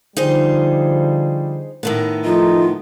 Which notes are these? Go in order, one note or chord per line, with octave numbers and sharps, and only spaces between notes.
D3 F3 G3 D#4 G#4 C5
A2 D#3 B3
F3 A3 D#4 F4